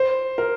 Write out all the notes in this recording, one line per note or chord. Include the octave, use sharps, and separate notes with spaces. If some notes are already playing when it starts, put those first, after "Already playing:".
Already playing: C5
A#4